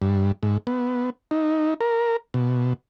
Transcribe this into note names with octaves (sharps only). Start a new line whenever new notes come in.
G2
G#2
B3
D#4
A#4
B2